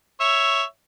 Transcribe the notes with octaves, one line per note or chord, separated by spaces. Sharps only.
C#5 E5